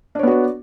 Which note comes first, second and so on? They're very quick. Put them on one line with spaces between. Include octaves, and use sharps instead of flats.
D4 C#5 B3 F#4 D5